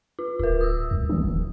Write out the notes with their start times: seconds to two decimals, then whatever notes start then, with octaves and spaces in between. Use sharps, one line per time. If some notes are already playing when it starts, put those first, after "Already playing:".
0.19 F4
0.39 D1 F4 A#4
0.61 D#6 E6
0.91 C2
1.09 D#3
1.24 D#1